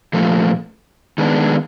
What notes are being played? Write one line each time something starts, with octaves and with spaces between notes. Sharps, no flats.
A#2 F3 A3
D#3 G#3 B3 D4